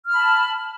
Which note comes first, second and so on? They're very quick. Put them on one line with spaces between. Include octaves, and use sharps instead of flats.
F6 B5 A5